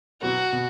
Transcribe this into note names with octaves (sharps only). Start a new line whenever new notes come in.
B2 F#3 B3 F#4
B2